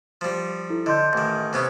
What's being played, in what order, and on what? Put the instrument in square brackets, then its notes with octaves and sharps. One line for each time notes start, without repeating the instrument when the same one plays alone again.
[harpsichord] F3 G3
[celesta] E4 A4
[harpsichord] D3 [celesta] D#5 C6 G6
[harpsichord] A1 D#3
C3 B3 C#4